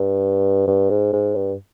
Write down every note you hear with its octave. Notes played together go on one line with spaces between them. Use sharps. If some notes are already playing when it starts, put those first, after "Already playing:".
Already playing: G2
G2
G#2
G#2
G2